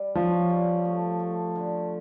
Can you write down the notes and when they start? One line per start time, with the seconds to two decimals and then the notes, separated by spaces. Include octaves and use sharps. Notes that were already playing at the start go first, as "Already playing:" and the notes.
Already playing: G3
0.15 F3 C#4
0.49 G3
0.85 A3
1.20 A3
1.55 D3